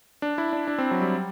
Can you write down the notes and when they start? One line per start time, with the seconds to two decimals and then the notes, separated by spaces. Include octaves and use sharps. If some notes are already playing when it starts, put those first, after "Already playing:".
0.22 D4
0.38 E4
0.53 D4
0.67 D4
0.78 C4
0.91 F#3
1.02 G3